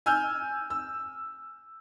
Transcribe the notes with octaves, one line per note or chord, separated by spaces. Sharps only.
G#5 E6 F6 G6
E6